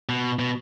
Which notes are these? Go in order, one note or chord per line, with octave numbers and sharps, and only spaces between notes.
B2
B2